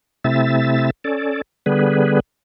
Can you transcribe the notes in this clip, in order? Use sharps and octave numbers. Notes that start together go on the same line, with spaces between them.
C3 A3 C4 E4 E5 A6
C#4 A4 D5
D3 G3 B3 G#4 B4